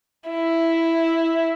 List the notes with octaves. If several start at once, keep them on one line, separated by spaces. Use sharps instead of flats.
E4